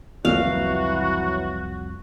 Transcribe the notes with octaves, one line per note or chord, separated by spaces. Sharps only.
C2 F2 E3 F#3 F#4 F5